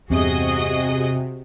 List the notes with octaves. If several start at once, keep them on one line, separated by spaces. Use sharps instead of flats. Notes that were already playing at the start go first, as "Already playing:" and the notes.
E2 G2 C3 F#4 G#4 D#5